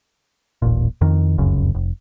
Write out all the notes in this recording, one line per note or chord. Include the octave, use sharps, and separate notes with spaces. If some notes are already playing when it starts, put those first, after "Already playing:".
D#1 A1 A#2
F2 D#3
F1 C#2 F#2 C#3
F1